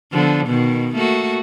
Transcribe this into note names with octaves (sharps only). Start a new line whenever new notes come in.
D3 F3 B3
B2 D#3
A3 A#3 F#4